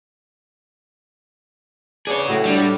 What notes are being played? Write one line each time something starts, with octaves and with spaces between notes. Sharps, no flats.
E2 E3 D4 G#4 C#5
A2 F#3
G3 D4